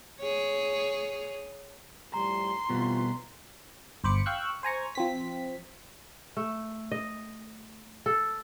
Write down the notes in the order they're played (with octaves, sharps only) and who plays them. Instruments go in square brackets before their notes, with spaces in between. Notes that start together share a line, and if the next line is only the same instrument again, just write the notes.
[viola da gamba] G#4 C#5
[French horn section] A2 F3 G3 [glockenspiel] A#5 [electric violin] C6
[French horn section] F2 E3 F4 [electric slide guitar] B2 G3 B3
[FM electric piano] G1 C5 B5 D6 C#7
F5 G5 C#6 E6 F#6
C5 G#5 A#5 C#6
F3 C4 B6
[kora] A3
D#5
A4